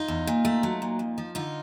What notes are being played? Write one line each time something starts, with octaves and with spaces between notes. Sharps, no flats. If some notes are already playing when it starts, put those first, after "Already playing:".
Already playing: D#4 F4
E2
A#2
A3
F#3
A#2
F2
F3
D3 D#4 F4